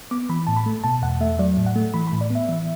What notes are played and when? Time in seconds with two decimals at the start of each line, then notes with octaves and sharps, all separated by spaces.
0.11 B3 D6
0.29 E3 B5
0.47 A2 A5
0.57 B5
0.66 A3
0.84 B2 A5
1.02 E2 F#5
1.21 A3 E5
1.39 F#3 D5
1.57 A2
1.66 F#5
1.76 A3
1.94 E3 B5
2.07 B5
2.12 A2
2.21 D5
2.30 B3 E5
2.49 E3